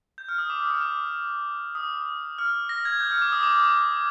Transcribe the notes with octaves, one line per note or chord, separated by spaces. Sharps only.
G6
F6
D#6
D6
D#6
F6
D6
D#6
F6
A#6
G#6
G6
F6
D6
D#6
D6
D#6
D6